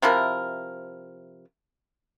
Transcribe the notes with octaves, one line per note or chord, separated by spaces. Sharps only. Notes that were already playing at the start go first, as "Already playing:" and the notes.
C3 F3 E4 A#4